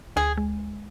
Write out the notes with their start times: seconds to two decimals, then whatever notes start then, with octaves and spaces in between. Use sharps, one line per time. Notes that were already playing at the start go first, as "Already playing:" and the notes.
0.16 D2 G#4
0.37 G#3